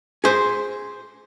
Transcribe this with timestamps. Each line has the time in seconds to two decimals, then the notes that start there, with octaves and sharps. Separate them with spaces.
0.24 G#4 C5